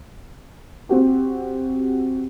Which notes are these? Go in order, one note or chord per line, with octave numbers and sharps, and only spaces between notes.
C4 F#4 G4